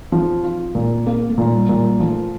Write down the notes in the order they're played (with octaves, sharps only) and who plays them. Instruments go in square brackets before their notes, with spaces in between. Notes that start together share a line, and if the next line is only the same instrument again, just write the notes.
[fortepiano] F3 [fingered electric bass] C4
[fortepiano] F4
A#2
[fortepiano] A#3 [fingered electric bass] C4
[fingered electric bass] A3
[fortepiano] A#2
[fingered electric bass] G3
[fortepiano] A#2
[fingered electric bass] G3
[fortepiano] F3 [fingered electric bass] A3